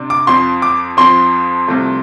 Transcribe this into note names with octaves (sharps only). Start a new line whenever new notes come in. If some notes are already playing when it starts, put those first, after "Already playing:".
Already playing: C3 D4
D6
F2 F3 C4 C6
D6
F2 F3 C4 C6
C2 C3 F3 A3